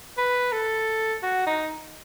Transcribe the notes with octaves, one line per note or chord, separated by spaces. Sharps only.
B4
A4
F#4
D#4